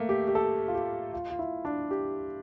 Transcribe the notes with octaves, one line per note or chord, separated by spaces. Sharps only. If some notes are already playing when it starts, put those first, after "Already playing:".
Already playing: A3 A#3
G4
G4
A4
F4
G4
F4
F4
E4
D4
G4